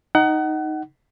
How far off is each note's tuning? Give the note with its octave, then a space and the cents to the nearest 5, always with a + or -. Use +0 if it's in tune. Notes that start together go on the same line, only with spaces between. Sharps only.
D#4 +0 F#5 +25